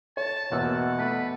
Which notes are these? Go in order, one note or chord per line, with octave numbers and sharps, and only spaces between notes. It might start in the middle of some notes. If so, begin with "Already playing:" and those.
C#5 A5
E2 B2 A#3 F#5 E6
A3 B3 B4